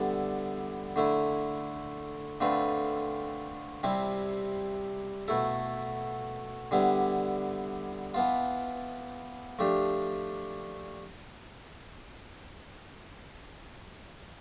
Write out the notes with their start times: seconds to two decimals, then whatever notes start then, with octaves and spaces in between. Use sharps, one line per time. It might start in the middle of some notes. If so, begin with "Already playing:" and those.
Already playing: D3 G3 B3 E4 A4
0.96 D3 A3 E4
2.40 D3 A3 C4 F4 B4
3.83 C3 G3 C4 E4
5.28 B2 A3 E4 A4
6.71 D3 G3 B3 E4
8.14 E3 B3 F4
9.59 F3 A3 D4 G4